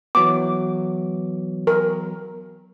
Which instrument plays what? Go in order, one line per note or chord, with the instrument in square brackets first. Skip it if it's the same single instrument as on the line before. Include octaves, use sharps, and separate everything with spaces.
[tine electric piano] E3 F#3 B3 [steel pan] D6
[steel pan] A#4